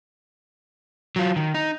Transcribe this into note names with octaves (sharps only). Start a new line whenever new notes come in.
F#3 F4
D#3
D#4